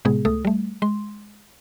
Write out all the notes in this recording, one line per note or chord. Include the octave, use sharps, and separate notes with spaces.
A2 C3 G#3 B3 G#4
C#2 A3 A4 D#6
G3 A3
G#3 C6